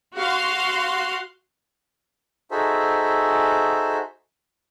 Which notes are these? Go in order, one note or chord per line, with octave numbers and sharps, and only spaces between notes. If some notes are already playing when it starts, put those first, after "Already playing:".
F#4 F5 C6
D#4 F#4 G#4 A4 C5 E5